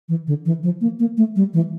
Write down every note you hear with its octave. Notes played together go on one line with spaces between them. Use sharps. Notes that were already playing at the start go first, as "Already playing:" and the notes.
E3
D3
E3
F3
A#3
A#3
A3
G3
E3